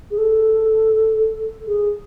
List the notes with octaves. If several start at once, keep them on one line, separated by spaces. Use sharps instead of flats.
G#4
A4
G#4